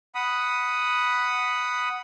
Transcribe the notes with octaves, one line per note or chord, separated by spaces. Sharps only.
F#5 B5 D#6